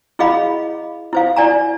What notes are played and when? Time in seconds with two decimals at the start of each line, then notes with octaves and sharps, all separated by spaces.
0.19 E4 G#4 D#5 F5 B5
1.13 E4 C5 F5
1.36 E4 D5 G#5 A#5